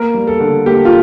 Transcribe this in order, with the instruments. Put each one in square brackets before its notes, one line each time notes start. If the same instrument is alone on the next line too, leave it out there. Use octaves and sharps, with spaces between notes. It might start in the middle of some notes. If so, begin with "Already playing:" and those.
Already playing: [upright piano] A#3 A#4
G3
A4
D3
A#3 G4
F4